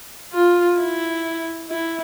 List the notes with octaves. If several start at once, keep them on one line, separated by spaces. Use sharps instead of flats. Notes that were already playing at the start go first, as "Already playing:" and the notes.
F4
E4
E4